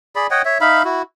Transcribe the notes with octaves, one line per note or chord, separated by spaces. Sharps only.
G#4 D5 B5
C#5 D#5 F#5 G5
C#5 E5
D#4 E5 F5 B5
E4 F#4